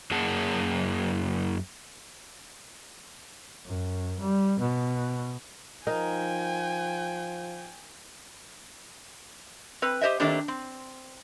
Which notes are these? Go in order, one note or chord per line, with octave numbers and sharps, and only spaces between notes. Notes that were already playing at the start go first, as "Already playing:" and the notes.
F#2 A#3 G#4 F#5 A5
F#2
G3
B2
F3 D#4 A#4 G5 G#5
C4 B4
G4 C5 D#5 E5
D#3 A3 A#3 C4 D4 G4
C4